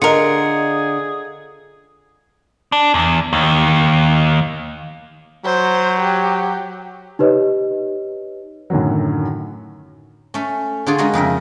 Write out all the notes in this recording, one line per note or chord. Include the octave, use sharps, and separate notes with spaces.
D3 F4 G#4 A#4 D#5 C#7
D4
E2
D#2
F#3 C5
G4
D#4 G4 B4 C#5 D#5
F#2 A2 D3 D#3 F#3
A3 C#4
D3 D4 F4 G#4 C#5 D5
G#3 C#4 F#4 A#4
F2 C#3 A#4 E5